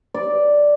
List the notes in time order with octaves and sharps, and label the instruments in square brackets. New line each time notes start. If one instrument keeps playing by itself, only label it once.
[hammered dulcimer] D5